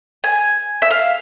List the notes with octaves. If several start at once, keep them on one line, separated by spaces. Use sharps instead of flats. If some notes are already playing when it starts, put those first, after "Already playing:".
G#5
E5
F5